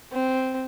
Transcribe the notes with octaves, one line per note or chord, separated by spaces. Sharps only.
C4